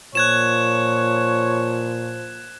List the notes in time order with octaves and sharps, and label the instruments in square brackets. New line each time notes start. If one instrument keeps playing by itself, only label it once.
[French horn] A#2 [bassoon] F3 [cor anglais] C#5 [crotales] F#6 G#6 E7